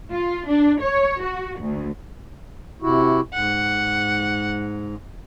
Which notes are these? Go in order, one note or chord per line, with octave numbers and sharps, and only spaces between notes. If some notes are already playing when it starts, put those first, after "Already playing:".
F4
D4
C#5
F#4
D2
C3 E4 F#4
G#2 F#5